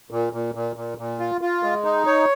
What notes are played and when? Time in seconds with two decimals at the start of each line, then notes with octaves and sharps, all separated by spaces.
0.11 A#2
0.33 A#2
0.55 A#2
0.76 A#2
0.98 A#2
1.19 F4
1.41 F4
1.63 G#3
1.85 D#4
2.06 C#5